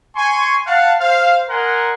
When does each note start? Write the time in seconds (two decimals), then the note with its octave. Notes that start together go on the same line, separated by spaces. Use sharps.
0.16 G#5 C6 C#6
0.66 F5 F#5 A5
1.00 C5 F5
1.49 A#4 D#5 F#5 G#5 A#5 C6